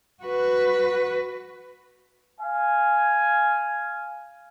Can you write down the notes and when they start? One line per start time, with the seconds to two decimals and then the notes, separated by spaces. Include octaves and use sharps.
0.24 F#4 B4
2.39 F5 G#5